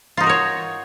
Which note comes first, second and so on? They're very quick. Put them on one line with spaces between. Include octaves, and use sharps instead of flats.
F4 D#4 F#4 A#4 C#5